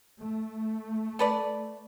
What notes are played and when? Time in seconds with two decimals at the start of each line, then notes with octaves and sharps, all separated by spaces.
0.20 A3
1.19 A4 B4 D5